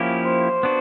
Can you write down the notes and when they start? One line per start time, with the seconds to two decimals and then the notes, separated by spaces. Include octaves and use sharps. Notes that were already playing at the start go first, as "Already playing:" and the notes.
Already playing: F3 A#3 C#4 E4 G4
0.25 C5
0.63 B3 D4 F#4